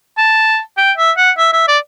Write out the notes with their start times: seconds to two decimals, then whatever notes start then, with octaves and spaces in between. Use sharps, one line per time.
0.18 A5
0.78 G5
0.97 E5
1.17 F#5
1.38 E5
1.53 E5
1.68 D5